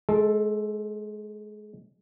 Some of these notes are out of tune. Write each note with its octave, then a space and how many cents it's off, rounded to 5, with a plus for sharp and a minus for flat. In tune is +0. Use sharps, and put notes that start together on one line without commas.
G#3 +30 A4 +0